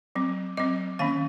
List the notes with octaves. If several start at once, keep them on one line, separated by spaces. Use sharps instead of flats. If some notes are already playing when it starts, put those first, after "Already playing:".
F#3 C4
F#3 C4 D#5
D#3 A#3 C#4 F5